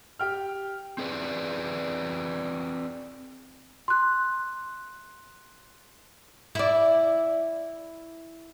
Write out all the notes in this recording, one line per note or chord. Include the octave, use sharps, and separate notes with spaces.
G4 G5 F6
C4 G#4 B4 D5
C6 F#6
E4 D5